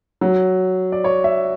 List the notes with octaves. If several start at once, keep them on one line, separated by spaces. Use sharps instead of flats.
F#3
D5
C#5
E5